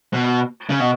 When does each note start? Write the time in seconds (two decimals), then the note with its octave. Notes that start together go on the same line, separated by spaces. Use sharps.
0.14 B2
0.70 C#3
0.80 B2